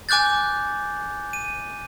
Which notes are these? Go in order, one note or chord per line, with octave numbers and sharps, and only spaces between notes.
G#5 D6 F#6 G6 A6
D#7